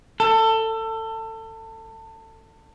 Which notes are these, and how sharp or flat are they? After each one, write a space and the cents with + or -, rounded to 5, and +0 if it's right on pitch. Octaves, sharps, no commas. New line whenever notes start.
A4 +25